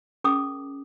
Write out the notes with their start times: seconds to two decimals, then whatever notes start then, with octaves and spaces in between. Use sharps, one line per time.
0.24 C#4 G#4 A#4 A5 D6 D#6